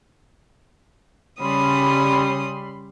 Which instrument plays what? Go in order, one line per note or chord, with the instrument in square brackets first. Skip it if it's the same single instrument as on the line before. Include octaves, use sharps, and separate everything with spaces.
[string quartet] C#3 C#4 D#6 [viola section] G3 B5 C6